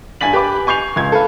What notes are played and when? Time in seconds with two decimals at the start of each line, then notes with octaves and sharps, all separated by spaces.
0.21 G2 G#5 A6 B6 F#7
0.33 G4 B4 B5 D6
0.67 G#5 C#6 G6 C7 F7
0.96 C#2 G#6
1.12 A4 B4 F5